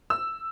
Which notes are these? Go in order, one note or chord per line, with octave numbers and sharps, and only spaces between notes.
E6